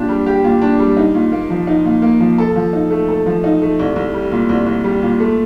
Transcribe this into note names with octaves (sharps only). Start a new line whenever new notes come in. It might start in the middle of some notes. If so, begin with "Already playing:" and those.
Already playing: A#2 D4 G4
G3
G4
A#2
D4
G3
D#4
A#2
A#3
F3
D#4
A#2
A#3
F3
A4
F3
D#4
A3
A4
F3
D#4
A3
C2
C2
G3
A#2
C2
C2
G3
A#2
A3